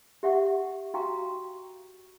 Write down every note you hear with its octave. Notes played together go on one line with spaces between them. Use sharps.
G4 E5 F#5 C#6
F#4 F5 G5 A#5 C#6